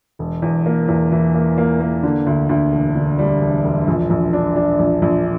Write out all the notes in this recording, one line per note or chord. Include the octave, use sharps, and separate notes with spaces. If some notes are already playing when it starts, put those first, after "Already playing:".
E1
E2
A#3
E2
E3
A#3
A#3
A#3
D3
D2
D2
E1
D3
G3
E1
E1
A#1
A#1
D4
D4
A#1
A#1